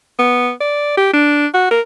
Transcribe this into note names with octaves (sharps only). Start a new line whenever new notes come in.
B3
D5
G4
D4
F#4
A#4